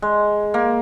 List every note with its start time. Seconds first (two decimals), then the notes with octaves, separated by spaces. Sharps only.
0.02 G#3
0.54 A#3